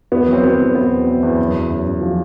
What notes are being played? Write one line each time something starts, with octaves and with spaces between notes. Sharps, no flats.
E2 B3
F#3 C4
F#3 B3
E2
E2 B3
E2
E2
E2
F#2
F#2
F#2
F#2
F3